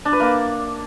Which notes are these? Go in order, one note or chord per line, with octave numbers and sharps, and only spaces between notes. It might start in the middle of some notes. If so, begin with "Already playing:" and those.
D4
B4
A#3